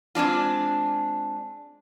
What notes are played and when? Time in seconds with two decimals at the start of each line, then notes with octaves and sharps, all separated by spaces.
0.15 G#3 C4 D4 F4